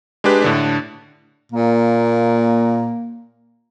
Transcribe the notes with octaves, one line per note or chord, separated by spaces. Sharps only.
G#3 D4 G4 B4
A2 D3 D4
A#2 A#3